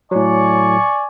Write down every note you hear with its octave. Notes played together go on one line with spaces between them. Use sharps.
A2 F#3 D5 G#5 C#6